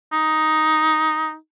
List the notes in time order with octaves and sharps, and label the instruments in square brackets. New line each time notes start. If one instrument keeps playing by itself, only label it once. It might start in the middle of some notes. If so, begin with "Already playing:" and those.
[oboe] D#4